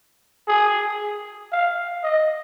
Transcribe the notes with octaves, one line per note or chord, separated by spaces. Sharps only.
G#4
F5
D#5